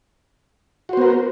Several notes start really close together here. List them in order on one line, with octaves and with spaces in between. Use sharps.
F#4 C5 B3 A#4